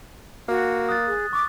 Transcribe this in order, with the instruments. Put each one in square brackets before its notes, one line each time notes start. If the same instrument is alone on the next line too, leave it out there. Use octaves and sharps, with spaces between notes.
[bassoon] A#3 [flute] F#4
[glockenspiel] D#6 F#6 A6
[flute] G#4
[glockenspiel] C#6 [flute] D6